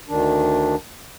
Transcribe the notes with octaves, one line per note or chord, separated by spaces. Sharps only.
D2 D#3 D4